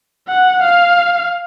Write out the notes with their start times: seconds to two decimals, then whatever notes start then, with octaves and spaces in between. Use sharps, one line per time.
0.28 F#5
0.62 F5